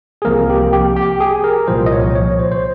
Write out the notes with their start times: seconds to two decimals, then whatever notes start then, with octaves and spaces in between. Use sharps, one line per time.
0.22 G#4
0.25 C2 C3 F3 A#3 A#4
0.50 G4
0.73 G4
0.96 G4
1.21 G#4
1.44 A#4
1.68 C2 A#2 F3 C5
1.86 D#5
1.92 C#5
2.15 C#5
2.39 C5
2.52 C5